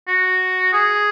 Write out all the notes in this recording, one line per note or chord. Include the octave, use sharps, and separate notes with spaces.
F#4
G#4